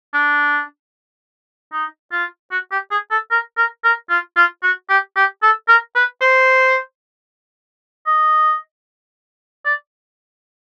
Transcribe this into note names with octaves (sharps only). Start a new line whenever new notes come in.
D4
D#4
F4
F#4
G4
G#4
A4
A#4
A#4
A#4
F4
F4
F#4
G4
G4
A4
A#4
B4
C5
D#5
D5